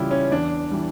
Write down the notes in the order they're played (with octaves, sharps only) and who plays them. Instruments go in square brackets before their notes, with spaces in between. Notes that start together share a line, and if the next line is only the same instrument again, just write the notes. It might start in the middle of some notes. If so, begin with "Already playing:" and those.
Already playing: [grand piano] C#2 C#3 E3 G3 E4 F4 G4
C#4
E2 D4
E3 G3